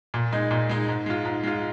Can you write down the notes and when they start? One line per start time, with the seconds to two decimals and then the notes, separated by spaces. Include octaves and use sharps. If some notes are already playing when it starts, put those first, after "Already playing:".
0.14 A#2
0.32 G#3 D#4
0.51 A#2
0.69 G#3 D#4
0.88 G#2
1.06 G#3 F4
1.25 G#2
1.43 G#3 F4